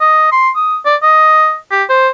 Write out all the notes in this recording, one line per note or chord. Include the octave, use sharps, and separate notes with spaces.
D#5
C6
D#6
D5
D#5
G4
C5